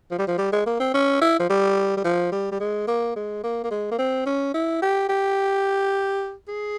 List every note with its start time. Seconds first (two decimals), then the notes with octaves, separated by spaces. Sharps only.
0.11 F3
0.19 G3
0.27 F3
0.38 G3
0.52 G#3
0.66 A#3
0.80 C4
0.94 C#4
1.21 E4
1.39 F3
1.49 G3
1.97 G3
2.04 F3
2.32 G3
2.51 G3
2.60 G#3
2.87 A#3
3.16 G#3
3.44 A#3
3.64 A#3
3.71 G#3
3.91 A#3
3.99 C4
4.26 C#4
4.54 E4
4.82 G4
5.09 G4
6.48 G#4